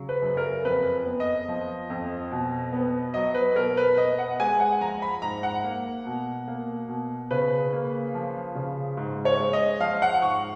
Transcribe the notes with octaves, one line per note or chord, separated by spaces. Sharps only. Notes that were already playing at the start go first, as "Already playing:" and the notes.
Already playing: C#3 F#3
B4
F#2
A#4
F2 B4
B3
D#5
F3
F2
B2
B3
F#3 D#5
B4
B2 A#4
B4
B3 D#5
F#5
G#3 G#5
F#5
F3 A#5
B5
G#2 A#5
F#5
A#3
B2
A#3
B2
C#3 B4
A#3
F3
C#3
G#2
C#5
G#3
D#5
F3 F5
F#5
G#2 C#6